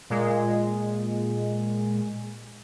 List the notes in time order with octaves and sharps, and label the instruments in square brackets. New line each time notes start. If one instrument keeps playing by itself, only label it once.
[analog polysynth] A#2 G#3